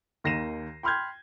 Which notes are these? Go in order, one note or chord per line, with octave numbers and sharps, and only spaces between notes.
D#2 D#3 A#6 C7 D#7 E7
G5 B5 C6 F6 G6 G#6